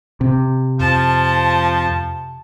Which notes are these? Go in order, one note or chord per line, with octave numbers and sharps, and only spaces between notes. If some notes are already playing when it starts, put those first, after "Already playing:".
C3
F2 F3 A5